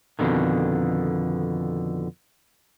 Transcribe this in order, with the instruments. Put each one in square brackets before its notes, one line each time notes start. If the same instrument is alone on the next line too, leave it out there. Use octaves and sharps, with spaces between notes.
[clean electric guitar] F2 B2 D3 D#3